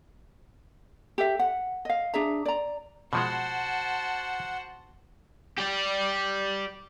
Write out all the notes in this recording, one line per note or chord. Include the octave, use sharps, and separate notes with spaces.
G4 A4 E5
F#5
D#5 F5
D4 G#4 E5 A#5
D5 A#5
B2 F3 G#3 F#4 C5 F#5 A5
G4 D5